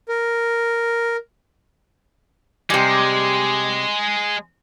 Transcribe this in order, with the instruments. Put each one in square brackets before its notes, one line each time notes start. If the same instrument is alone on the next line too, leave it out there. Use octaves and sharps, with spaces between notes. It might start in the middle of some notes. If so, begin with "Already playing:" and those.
[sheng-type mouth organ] A#4
[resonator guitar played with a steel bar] C3 G3 [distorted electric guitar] G#3